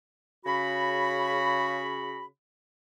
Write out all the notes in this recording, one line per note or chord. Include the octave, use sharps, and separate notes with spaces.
C#3 F#4 B5